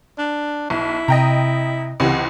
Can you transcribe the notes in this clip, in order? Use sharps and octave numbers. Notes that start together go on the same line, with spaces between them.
D4
B1 E4
C3 D#5 G5 A#5
C#2 C3 E3 G4 F#5